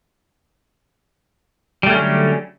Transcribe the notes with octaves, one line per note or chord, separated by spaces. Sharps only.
D3 F#3 G3 A3 C#4